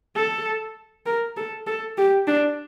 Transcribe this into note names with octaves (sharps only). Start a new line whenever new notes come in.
A4
A#4
A4
A4
G4
D4